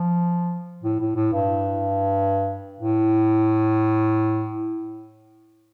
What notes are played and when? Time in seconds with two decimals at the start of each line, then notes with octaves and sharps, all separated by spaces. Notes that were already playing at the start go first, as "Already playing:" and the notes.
Already playing: F3
0.83 A2
1.00 A2
1.16 A2
1.33 G2
2.81 A2